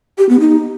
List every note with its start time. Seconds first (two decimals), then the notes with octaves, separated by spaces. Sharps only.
0.18 G4
0.29 B3
0.40 D#4